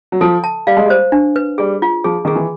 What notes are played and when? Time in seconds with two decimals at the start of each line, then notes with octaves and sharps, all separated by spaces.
0.12 F#3
0.21 F3 A4
0.44 A5
0.67 G3 F5
0.77 G#3
0.86 G3
0.90 C5
1.12 D4
1.36 B4
1.58 G3 G#4
1.82 F4
2.04 F3 G#4
2.25 D#3 G#4
2.36 E3